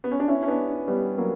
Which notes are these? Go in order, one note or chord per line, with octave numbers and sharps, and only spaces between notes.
B3
C#4
D4
C#4 E4
C#4
B3 D4
G3 B3
F#3 A#3